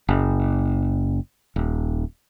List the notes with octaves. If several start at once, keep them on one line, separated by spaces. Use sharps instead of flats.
F#1
D#1